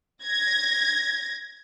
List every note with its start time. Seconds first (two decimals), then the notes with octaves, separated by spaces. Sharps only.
0.24 G#6 A#6